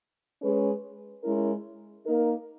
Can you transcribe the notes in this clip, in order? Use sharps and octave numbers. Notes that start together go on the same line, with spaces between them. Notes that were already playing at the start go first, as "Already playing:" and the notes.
G#3 C#4 G#4 B4
G#3 C#4 E4 A#4
A#3 D#4 A#4